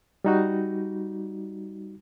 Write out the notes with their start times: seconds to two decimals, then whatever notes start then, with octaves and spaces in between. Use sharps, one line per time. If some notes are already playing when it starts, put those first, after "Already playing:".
0.25 G3 D#4 F#4